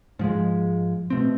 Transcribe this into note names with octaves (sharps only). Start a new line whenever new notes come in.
G#2 F3 G#3
B2 A3 C4